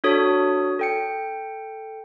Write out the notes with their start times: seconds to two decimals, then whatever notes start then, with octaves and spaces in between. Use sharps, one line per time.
0.04 D4 F#4 A4 C#5 D#6
0.79 A4 G5 C#7